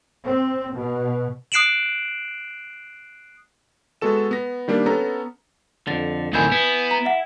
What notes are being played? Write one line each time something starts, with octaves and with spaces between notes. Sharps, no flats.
C4
B2
D#6 F#6 C7 D7 E7 F#7
G#3 B3 F#4 A4 E7
B3 A#6
D#3 G3 A#3 D4
B3 C#4 A4 A#5
F2 D3 A6
D2 D#3 F3 E4 G#5 G6 G#6
B3 E4
A#5
E5 F#5